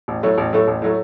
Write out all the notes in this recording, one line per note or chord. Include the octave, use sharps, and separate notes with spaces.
A1
A2 F#3 A3
A1
A2 F#3 A3
A1
A2 F#3 A3